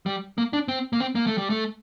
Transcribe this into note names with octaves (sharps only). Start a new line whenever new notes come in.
G3
A#3
D4
C4
A#3
C4
A#3
A3
G3
A3